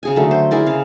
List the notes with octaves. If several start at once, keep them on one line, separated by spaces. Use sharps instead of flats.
C#3 G#4 G#5
D3 F#3 A3
C5
E4 G#4 A#4 D5
C#3 F5